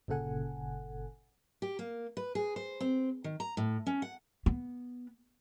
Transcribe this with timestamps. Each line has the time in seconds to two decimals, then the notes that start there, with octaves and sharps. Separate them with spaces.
0.08 G1 A#2 C#3 A4 F#5 G#5
1.62 G4
1.79 A#3
2.17 B4
2.35 G#4
2.56 C5
2.80 C4
3.24 D#3
3.40 A#5
3.57 A2
3.87 C#4
4.02 F#5
4.46 B3